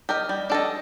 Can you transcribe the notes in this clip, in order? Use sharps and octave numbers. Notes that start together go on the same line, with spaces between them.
G4 A#4 D#5
G3
D4 A4 D#5